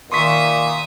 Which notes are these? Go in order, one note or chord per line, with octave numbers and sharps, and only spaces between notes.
A#2 D#3 E5 C6 C#6 D#6 B6